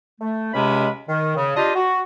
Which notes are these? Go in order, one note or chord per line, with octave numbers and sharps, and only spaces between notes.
A3
C#2 C3 G#3 C#4 B5
D#3
C#3
D4 F4 G4 D#5
F#4